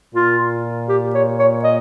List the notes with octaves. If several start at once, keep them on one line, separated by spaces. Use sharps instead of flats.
A#2 F4
G4
C#5
C#5
D#5